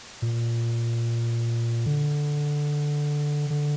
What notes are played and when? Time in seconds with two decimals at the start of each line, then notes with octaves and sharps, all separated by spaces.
0.22 A#2
1.86 D3
3.50 D3